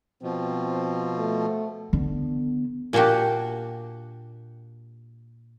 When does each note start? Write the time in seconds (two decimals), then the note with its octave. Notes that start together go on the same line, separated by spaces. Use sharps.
0.23 B2 F3 C4
1.18 A3
1.93 D3 B3
2.93 A#2 A#3 D4 F#4 G4